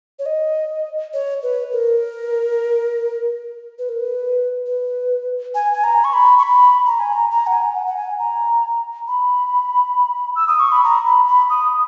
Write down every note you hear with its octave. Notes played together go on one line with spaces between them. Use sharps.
C#5
D#5
C#5
B4
A#4
B4
A#4
B4
B4
G#5
G#5
A#5
C#6
B5
C#6
B5
A#5
G#5
A#5
A#5
F#5
G#5
F#5
F#5
G#5
A#5
B5
E6
D#6
C#6
B5
A#5
B5
B5
D#6